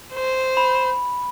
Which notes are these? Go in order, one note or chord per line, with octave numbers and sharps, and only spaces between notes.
C5
B5